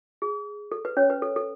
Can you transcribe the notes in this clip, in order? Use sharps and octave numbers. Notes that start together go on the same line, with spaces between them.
G#4
A4
B4
C#4 C#5
B4
A4
A4